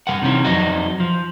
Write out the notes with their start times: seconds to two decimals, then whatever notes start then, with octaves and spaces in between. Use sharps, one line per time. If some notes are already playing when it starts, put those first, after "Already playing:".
0.07 G2 E3 A#4 F#5
0.22 C3 D#3 E3 C#4
0.44 F2 F#3 D#4 F#4
1.00 F3